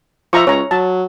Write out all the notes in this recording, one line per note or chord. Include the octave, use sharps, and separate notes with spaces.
F3 E5 A#5 C#6
C#2 C#5 A#5
F#3 A5